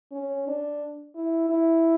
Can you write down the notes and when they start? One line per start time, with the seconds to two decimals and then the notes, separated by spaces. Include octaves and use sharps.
0.12 C#4
0.47 D4
1.15 E4
1.49 E4